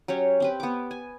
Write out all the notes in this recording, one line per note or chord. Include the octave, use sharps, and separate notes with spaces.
F#3 C#4 G4 C#5
C4 G4 B4
B3 D6
G#5